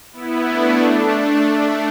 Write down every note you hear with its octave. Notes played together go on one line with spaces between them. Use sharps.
B3 E4
A3 D4
A3 D4